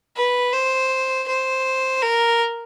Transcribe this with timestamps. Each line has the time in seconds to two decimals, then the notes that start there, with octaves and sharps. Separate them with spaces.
0.16 B4
0.53 C5
1.28 C5
2.02 A#4